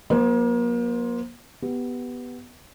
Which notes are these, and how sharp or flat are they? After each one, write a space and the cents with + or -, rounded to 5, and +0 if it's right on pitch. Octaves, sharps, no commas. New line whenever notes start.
F#3 -35 A#3 +35 C5 +0
B3 +0 G4 +0